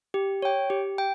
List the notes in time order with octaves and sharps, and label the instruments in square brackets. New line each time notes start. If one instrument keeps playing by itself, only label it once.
[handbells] G4
C#5 G5
G4
G5